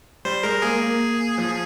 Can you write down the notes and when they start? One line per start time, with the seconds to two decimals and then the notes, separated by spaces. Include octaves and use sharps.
0.25 G3 C5
0.43 G#3 A#4
0.62 A#3 G#4
0.81 A#3
1.38 F3